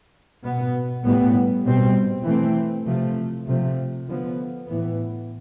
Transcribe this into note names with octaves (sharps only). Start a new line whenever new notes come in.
B2 B3
A2 G3 B3
B2 G3 C4
E3 A3 C4
C3 F3 A3
C3 F3 A3
D3 F3 B3
A2 E3 B3